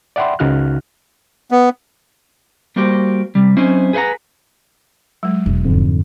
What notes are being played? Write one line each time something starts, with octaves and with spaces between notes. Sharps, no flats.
D5 E5 F#5 G5 B5 C6
C#2 C#3 D#4 F#4 F6 F#6
B3
G3 A#3 F#4 G4 C5
C3 G3
F#3 C4 C#4 D#4 E4 C5
G#4 B4 C5 F5 F#5 A#5
F#3 G#3
E1
F2 G#2 D3